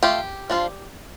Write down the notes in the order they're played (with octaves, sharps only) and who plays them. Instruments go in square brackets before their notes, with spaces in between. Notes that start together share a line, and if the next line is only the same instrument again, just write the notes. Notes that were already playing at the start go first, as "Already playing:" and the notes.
[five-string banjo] A3 F4 G4
F3 D4 F4